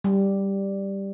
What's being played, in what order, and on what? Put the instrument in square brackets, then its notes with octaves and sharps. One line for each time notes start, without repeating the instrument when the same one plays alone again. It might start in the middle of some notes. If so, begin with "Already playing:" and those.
[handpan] G3